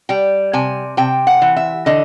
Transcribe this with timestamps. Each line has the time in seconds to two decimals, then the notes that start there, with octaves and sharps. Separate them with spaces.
0.09 G3 G5
0.53 C3 G#5
0.97 C3 G5
1.27 F#5
1.42 E3
1.56 E5
1.86 D3 D#5